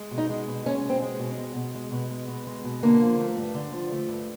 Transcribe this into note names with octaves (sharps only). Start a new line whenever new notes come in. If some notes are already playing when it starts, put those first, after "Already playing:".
Already playing: G#3
B2
D#4
G#3
B2
G#3 C#4
B2
C4
G#3
B2
G#3
B2
G#3
B2
G#3
B2
G#3
B2
D3 A#3
F3
A3
G2
D3
F3
A3
G2